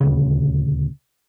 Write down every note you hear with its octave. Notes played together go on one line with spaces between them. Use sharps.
D#1 D2 C#3